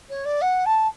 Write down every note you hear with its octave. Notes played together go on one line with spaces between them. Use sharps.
C#5
D5
F#5
A5